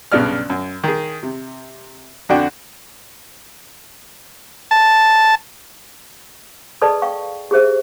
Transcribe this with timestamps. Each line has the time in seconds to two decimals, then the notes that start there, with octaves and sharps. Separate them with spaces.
0.12 B1 G2 C#3 B3 D5 F6
0.50 F#2
0.84 D#3 G#4
1.23 C3
2.29 F2 D3 D4 F#4 G5
4.71 A5
6.81 G#4 A4 B4 D5 D#5 A5
7.02 F5 G5 C#6
7.51 G4 G#4 C5 E5